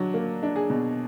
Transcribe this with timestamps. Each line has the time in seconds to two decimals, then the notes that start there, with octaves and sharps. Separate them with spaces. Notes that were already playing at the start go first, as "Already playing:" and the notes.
Already playing: F#3 D4
0.14 A#3
0.43 D4
0.56 G#4
0.70 B2